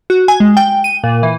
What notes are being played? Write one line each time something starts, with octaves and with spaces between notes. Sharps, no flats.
F#4
G#5
G#3
G5
D#7
A#2
E3